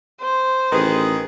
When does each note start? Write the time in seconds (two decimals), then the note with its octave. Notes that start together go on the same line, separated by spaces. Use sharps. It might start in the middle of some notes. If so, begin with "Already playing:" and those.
0.21 C5
0.72 A1 D#3 G#4 B4